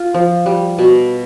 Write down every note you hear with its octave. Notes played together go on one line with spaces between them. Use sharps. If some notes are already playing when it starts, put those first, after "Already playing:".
Already playing: F4
F3
G3
B2